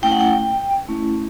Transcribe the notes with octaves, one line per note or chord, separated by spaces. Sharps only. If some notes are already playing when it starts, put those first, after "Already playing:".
A3 C#4 E4 G5
F#5
G5
A3 C#4 E4